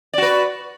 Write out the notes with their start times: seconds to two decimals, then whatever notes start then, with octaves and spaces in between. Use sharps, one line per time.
0.13 D5
0.18 F#4
0.22 B4